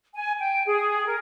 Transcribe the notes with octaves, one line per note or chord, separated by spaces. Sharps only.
G#5
G5
G#4
A#4